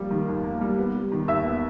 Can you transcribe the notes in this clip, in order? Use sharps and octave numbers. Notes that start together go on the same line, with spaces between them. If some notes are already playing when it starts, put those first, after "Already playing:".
Already playing: F3 G3 A#3
D#3
D#2
A#3
G3
B3
G3
D#3
D#2 E5 E6
B3